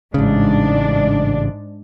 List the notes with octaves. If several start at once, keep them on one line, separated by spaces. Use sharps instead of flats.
A1 G#2 C#3 D4